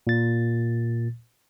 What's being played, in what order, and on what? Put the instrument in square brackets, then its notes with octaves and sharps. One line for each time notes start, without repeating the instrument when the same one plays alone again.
[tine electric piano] A#2 A6